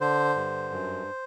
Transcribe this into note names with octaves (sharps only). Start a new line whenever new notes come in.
D3 C5
G2
F#2